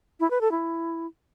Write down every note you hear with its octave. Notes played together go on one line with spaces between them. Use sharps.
E4
B4
A4
E4